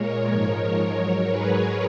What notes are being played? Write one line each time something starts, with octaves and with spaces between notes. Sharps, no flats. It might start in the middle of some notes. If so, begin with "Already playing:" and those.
Already playing: A#2 G#3 A#4 C#5
G#2 F3 G#3 A#4 C#5
A#4 C#5
G#2 F#3
G#4 B4